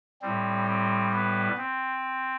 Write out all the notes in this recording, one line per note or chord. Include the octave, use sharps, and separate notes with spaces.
A2 G3 C4
C4
B3
C4